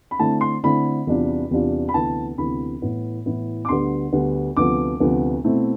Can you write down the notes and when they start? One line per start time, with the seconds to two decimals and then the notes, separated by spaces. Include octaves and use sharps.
0.11 B5
0.19 D3 A3 C4 E4 A5
0.41 C6
0.64 D3 A3 C4 E4 B5
1.07 E2 C3 G3 D4 F4
1.51 E2 C3 G3 D4 F4
1.89 B5
1.94 D2 C3 E3 B3 A5
2.38 D2 C3 E3 B3 B5
2.82 A2 E3 B3 E4
3.26 A2 E3 B3 E4
3.65 D6
3.69 D2 D3 G3 B3 C6
4.13 D2 D3 G3 B3
4.57 D2 C3 F3 B3 D6
5.00 D2 C3 F3 B3
5.44 B2 A3 C4 E4